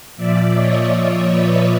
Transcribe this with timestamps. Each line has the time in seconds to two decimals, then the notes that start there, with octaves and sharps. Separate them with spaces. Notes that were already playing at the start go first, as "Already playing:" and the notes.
0.16 A#2 F3 D5 E5
0.54 C#5 D#5
0.92 C#5 D#5
1.30 B4 C#5